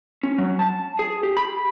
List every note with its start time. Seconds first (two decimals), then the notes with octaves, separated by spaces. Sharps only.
0.23 C#4
0.38 F#3
0.59 A5
0.99 G#4
1.23 G4
1.37 B5